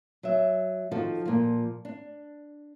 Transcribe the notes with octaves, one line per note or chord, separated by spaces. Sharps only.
F#3 E5
D#3 F3 F#4 A4
A#2 F3
D4